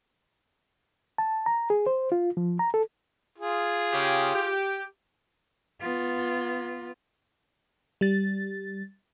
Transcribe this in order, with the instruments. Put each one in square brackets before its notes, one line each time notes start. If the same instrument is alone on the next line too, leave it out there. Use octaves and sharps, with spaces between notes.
[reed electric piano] A5
A#5
G#4
C5
F4
F3
A#5
A4
[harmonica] F4 G#4
[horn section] C#3 G4
G4
[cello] B3 F4
[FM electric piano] G3 A6